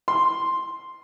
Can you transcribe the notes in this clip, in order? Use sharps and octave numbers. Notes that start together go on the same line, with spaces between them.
C6